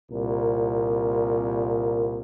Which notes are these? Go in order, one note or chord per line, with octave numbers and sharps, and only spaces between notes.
C2 A#2 A#4